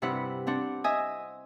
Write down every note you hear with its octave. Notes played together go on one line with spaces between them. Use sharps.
G2 C3 E4 B4 F#5
C4 D4 F#5
D#5 E5 G#5 D#6